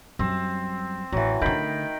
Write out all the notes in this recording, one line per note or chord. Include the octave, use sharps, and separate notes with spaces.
F#2 G3 C4
A1 E3 F#3
D3 D#3 A3 G5 B5